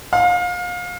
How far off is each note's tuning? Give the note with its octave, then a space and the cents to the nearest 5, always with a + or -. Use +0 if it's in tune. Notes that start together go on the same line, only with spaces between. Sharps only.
F5 +30